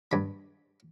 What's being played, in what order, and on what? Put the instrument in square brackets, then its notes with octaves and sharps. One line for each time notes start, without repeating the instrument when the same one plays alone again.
[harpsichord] G2 B5